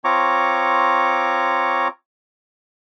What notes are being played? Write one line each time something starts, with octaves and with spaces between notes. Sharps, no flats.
C4 F4 C#5 A#5 C#6 D6